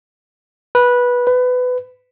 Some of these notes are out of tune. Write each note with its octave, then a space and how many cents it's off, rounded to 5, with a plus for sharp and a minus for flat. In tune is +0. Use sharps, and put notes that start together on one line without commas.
B4 -15
B4 +20